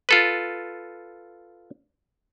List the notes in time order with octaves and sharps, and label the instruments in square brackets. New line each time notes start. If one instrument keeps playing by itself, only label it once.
[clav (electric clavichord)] F4 A4 B4